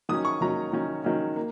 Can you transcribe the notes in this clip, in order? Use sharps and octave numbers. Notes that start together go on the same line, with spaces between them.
D#3 F#3 C#4 D#6
C#6
D#3 F#3 C#4 A#5
D#3 F#3 C#4
D#3 F#3 C#4
A#3